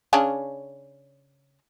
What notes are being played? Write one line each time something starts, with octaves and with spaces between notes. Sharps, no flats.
C#3 C#4 D4